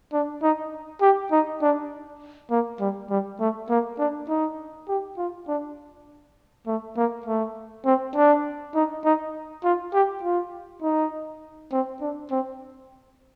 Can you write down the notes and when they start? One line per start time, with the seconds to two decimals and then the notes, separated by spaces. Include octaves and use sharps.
0.13 D4
0.43 D#4
1.02 G4
1.32 D#4
1.62 D4
2.51 A#3
2.80 G3
3.10 G3
3.40 A3
3.69 A#3
3.99 D4
4.29 D#4
4.88 G4
5.18 F4
5.48 D4
6.67 A3
6.97 A#3
7.26 A3
7.85 C4
8.15 D4
8.75 D#4
9.05 D#4
9.64 F4
9.94 G4
10.23 F4
10.82 D#4
11.72 C4
12.01 D4
12.31 C4